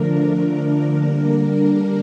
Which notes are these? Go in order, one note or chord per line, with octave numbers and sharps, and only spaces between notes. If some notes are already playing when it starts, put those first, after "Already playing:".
Already playing: D3 F3 A3 D4 A#4
D3 G3 A#3 D4